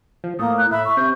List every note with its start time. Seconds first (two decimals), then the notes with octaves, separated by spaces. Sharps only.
0.24 F3
0.39 A2 A#3 D#6
0.58 F#6
0.71 A2 E5 B5
0.84 C#6
0.97 C3 G6